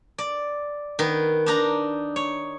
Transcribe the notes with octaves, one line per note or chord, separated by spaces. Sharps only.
D5
D#3 B3
D4 D#4 A#5
C#5